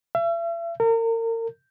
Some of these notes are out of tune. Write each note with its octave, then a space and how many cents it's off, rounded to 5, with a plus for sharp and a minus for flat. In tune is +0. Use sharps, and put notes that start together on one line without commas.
E5 +40
A#4 -35